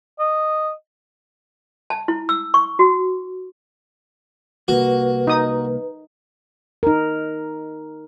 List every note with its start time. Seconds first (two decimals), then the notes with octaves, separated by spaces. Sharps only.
0.19 D#5
1.90 A5
2.08 E4
2.29 E6
2.54 C#6
2.79 F#4
4.68 C2 A#3 F#4 B4
5.27 D#4 D#6
6.83 D#4 A#4